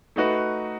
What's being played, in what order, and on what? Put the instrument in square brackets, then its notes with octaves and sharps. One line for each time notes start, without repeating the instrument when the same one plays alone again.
[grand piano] A3 D#4 F#4 B4